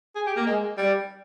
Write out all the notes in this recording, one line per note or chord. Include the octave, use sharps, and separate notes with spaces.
G#4
G4
A#3
G#3
G3